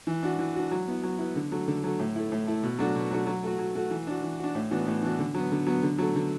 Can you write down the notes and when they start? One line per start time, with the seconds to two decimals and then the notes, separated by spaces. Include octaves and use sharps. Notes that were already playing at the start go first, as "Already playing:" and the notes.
0.07 E3
0.23 D4 F#4
0.39 E3
0.56 D4 F#4
0.71 F#3
0.88 B3 E4
1.03 F#3
1.19 B3 E4
1.36 D3
1.51 F#3 A3
1.68 D3
1.84 F#3 A3
1.99 A2
2.16 A3 E4
2.32 A2
2.47 A3 E4
2.63 B2
2.79 F#3 A3 D4 F#4
2.96 B2
3.11 F#3 A3 D4 F#4
3.27 F#3
3.43 A3 F#4
3.59 F#3
3.75 A3 F#4
3.91 E3
4.07 D4 F#4
4.24 E3
4.39 D4 F#4
4.55 A2
4.71 E3 B3 D4 F#4
4.87 A2
5.03 E3 B3 D4 F#4
5.19 D3
5.34 F#3 B3
5.52 D3
5.67 F#3 B3
5.83 D3
5.98 F#3 A3
6.15 D3